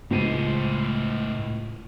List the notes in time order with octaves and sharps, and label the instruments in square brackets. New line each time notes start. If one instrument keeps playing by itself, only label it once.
[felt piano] C#2 D#7 [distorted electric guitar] A2 C5